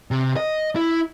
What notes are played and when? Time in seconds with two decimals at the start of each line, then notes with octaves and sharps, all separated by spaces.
0.11 C3
0.36 D#5
0.76 E4